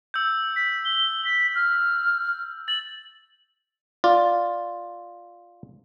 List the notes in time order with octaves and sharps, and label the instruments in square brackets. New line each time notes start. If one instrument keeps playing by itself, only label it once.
[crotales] E6 G6
[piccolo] B6
G7
B6
F6
[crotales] A6 [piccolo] F#7
[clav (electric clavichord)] F4 D5